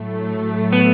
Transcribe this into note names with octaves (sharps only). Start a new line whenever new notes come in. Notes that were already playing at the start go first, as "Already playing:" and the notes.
Already playing: A2 F#3 A3
B3